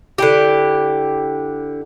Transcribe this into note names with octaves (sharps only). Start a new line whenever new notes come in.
D3 E4 G4